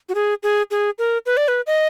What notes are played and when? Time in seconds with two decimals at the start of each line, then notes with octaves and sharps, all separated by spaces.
0.09 F#4
0.15 G#4
0.43 G#4
0.71 G#4
0.98 A#4
1.26 B4
1.37 D5
1.48 B4
1.67 D#5